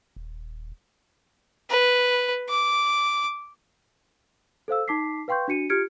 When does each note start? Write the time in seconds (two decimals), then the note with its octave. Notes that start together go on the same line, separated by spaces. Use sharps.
0.16 D#1
1.70 B4
2.49 D6
4.68 A4 C5 F5 E6
4.88 D#4 A5 D6 B6 C7
5.28 B4 F5 G5 C6 C#6 G6
5.48 D4 F#4 C#7 D#7
5.70 F4 G4 F6 G#6 C#7 D7